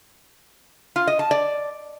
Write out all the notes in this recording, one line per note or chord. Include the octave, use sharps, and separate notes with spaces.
F4
D#5
A5
D5